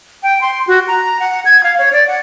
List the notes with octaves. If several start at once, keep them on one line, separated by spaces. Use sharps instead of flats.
G5
C6
F#4
A#5
F#5
G#6
F5
C#5
D5
F#5